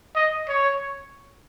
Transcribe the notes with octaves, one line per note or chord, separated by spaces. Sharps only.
D#5
C#5